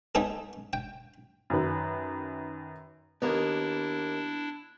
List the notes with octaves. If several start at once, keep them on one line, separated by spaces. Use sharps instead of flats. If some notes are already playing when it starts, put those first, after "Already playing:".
B3 D#4 G#4 A4
G5
F#2 D#3 B4
D#2 A#3 B3 D4 E4